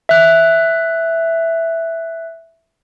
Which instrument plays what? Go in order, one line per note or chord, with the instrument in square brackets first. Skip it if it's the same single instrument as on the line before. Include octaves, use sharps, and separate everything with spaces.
[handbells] E5 F#6